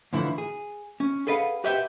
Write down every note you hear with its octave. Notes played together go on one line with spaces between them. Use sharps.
A2 D3 E3 F3 E4
G#4
C#4
G#4 A4 B4 D#5 F5 F#5
G4 B4 C5 E5 F#5 G5